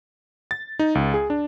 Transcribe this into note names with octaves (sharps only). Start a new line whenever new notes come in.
A6
D#4
C#2
G#4
D4